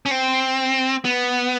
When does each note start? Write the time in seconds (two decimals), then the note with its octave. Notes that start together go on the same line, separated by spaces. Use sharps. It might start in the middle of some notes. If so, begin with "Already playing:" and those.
0.06 C#4
0.11 C4
1.05 B3